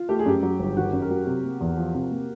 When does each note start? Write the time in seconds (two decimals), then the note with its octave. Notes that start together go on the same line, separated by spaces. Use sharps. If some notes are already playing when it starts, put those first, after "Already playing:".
Already playing: F4
0.09 A3 G4
0.19 G#4
0.26 F#2 G4
0.43 F#3
0.60 G1
0.77 D#3 F#4
0.93 F#2
1.02 A#4
1.10 F#3
1.27 C3
1.44 A#3
1.61 E2
1.77 F3
1.94 C3
2.11 A#3